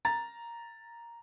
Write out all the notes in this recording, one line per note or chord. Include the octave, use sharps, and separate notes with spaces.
A#5 A6